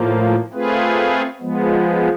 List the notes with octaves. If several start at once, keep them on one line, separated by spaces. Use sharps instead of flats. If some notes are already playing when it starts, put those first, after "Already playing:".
Already playing: A2 F3 A#3
A3 C4 F4 G#4 B4
F3 G#3 B3